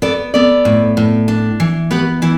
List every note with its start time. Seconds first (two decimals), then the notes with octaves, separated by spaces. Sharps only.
0.02 B3 A4 D5
0.34 B3 A4 D5
0.65 A2
0.97 A2
1.28 D4
1.60 E3
1.91 B3 G4 B4
2.22 E3 E4